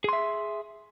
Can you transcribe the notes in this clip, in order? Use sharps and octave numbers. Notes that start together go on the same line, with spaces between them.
G#4 E5 C6